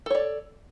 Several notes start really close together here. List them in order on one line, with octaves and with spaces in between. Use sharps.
A4 C#5 D5